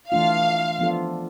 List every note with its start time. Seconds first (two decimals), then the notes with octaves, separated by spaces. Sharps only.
0.11 E3 A3 D4 F4 F5
0.79 F3 B3 D4 F4 A4